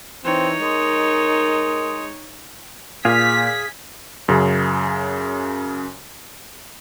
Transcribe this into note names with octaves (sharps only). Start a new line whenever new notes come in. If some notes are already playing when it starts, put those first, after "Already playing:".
E3 C4 D#4 C#5
G#3 A#4
A#2 G#4 F5 B6
F#2 C#3